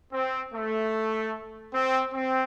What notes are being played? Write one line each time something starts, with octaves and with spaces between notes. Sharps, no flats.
C4
A3
C4
C4